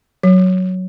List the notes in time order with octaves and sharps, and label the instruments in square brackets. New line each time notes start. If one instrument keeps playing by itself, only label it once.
[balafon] F#3